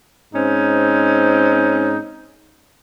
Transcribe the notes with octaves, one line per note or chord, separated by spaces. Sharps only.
G#2 C4 C#4 D#4